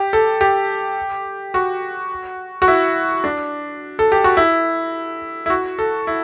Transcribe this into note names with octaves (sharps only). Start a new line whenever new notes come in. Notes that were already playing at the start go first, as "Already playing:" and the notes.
Already playing: G4
A4
G4
F#4
F#4
E4
D4
A4
G4
F#4
E4
E4
F#4
A4
E4